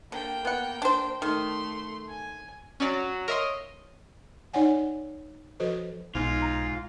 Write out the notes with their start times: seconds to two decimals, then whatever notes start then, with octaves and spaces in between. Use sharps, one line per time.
0.12 D3 A#3 G5
0.45 B3 F#5
0.82 D4 C5
1.22 D#3 A3 C6
2.08 G#5
2.80 F#3 C#4 D5 A6
3.28 A#4 C#5 D#5 E5 C6
4.53 D#4 C#5 D5 F#5 G#5
5.60 F3 F#4 A4 B4 C5 D#5
6.15 B1 G#2 F4
6.42 A#5